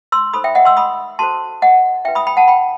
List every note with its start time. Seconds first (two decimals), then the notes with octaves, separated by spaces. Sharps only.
0.12 C6 E6
0.33 D#4 A4 C5 B5 D#6
0.44 E5 G5
0.55 D#5 F#5
0.65 C6 E6
0.77 B5 D#6
1.19 F#4 A4 C5 A5 C6
1.62 D#5 F#5
2.05 D#4 F#4 B4 E5 G5
2.15 B5 D#6
2.27 G5 B5
2.37 F#5 A5
2.48 G5 B5